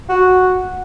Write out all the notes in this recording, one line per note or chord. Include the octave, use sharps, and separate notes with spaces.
F#4